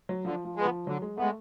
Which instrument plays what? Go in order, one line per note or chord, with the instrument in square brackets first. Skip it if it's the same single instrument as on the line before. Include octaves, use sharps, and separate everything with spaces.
[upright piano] F#3
[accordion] D3 [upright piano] F3
[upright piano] F3
[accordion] G#3 B3
[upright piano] F3
[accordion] D3 [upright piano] F#3
[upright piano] G#3
[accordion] G#3 B3 [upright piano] A3